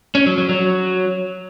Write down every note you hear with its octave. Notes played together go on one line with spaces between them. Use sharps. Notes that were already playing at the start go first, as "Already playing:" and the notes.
C#4
F#3
F#3
F#3